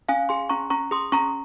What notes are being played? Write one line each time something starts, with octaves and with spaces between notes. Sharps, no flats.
C#4 F5 G#5
G#4 G#5 C6
C#4 A#5 C#6
C#4 A#5 C#6
G#4 C6 D#6
C#4 A#5 C#6